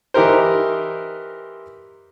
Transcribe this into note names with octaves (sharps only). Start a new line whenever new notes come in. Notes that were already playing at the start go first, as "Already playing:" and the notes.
E3 D#4 G4 A#4 C5